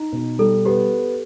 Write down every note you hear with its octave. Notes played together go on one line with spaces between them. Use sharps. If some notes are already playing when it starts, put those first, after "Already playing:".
Already playing: D#4
B2
G3 A4
B3 G4